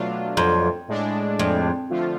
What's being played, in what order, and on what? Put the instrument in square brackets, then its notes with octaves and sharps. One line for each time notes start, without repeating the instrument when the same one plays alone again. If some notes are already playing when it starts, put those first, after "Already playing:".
Already playing: [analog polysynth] B2 F#3 A3 D4 F4
[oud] F2
[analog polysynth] A2 G#3 D4
[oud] F2
[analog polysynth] D3 F3 A3 F4